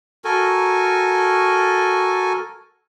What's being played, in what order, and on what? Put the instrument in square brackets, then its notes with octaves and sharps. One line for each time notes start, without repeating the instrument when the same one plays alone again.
[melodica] F#4 A4 A#4 G#5